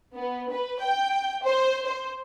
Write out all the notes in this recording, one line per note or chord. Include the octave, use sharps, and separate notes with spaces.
B3
B4
G5
C5
C5